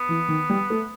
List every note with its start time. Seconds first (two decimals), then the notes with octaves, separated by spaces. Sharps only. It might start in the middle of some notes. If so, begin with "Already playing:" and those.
Already playing: B3
0.09 E3
0.28 D#3
0.50 G3
0.70 A3